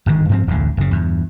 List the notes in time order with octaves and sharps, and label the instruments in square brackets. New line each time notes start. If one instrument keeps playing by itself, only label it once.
[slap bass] G1 G#2 D3 D#3
G2 F3 C4
D1 A1 F2 D3
F#1 C#3
E2 G2